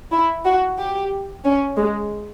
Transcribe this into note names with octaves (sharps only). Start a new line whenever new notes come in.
E4
F#4
G4
C#4
G#3